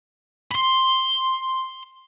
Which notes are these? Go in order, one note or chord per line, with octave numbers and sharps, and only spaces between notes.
B5 C6